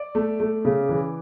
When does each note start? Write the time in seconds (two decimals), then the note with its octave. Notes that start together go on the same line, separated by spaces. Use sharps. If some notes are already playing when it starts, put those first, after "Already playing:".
Already playing: D5
0.15 A3
0.40 A3
0.65 C#3
0.89 E3